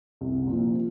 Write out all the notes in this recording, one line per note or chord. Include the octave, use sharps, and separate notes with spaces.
C2
A#2 F3